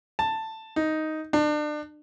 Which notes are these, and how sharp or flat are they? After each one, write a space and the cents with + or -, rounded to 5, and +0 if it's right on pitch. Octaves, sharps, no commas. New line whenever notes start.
A5 +10
D#4 +5
D4 +35